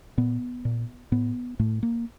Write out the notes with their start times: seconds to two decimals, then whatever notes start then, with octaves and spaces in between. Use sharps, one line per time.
0.18 A#2 B3
0.65 A#2
1.12 A2 B3
1.59 A2 A3
1.83 A#3